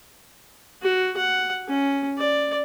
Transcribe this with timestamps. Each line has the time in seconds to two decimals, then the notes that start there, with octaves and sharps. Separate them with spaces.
0.82 F#4
1.17 F#5
1.68 C#4
2.17 D5